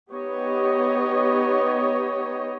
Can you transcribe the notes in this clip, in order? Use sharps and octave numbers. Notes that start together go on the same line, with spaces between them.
B3 D#4 G4 C#5 D#5